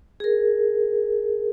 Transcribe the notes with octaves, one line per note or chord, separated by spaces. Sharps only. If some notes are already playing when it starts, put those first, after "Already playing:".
G#4 A#4